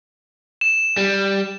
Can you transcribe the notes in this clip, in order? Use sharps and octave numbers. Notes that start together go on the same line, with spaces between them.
E7
G3